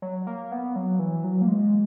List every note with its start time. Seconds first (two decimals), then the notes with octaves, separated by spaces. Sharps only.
0.02 F#3
0.27 A#3
0.52 B3
0.76 F#3
0.99 E3
1.24 F#3
1.41 A#3
1.48 G#3